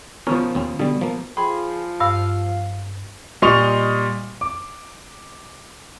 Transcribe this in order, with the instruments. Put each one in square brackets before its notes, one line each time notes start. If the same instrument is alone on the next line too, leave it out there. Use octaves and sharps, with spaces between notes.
[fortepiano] B2 D#3 F3 [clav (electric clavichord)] C#4 A#4 C#5
[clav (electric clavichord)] D#2 C4 C#4
[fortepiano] B2 [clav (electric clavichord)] D3 G3
[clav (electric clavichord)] F3 A#3
[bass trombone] F3 [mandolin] G#4 [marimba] G5 [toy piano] B5 C6
[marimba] G2 [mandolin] F5 [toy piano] E6
[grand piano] A#2 G3 D#5 C6 C#6 F7
D6